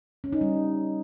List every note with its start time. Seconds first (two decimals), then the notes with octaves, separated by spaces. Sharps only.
0.24 C#4
0.33 D#4
0.41 G3